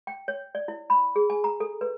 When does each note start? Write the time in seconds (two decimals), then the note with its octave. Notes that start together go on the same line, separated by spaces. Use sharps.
0.07 G5
0.28 C#5
0.55 D5
0.68 E4
0.90 B5
1.16 G#4
1.30 G#5
1.44 A#5
1.60 A4
1.81 B4